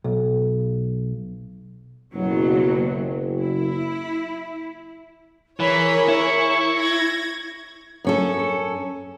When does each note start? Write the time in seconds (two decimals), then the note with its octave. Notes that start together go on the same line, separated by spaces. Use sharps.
0.04 B1
2.13 F#1 D#2 B2 F#3
3.41 E4
5.60 E3 G#4 A#4 C#5 B5
6.08 E4 C#6
6.75 G#6 A#6
8.04 F#2 C#4 A4